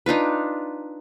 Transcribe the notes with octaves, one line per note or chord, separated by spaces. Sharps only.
D4 D#4 F4 B4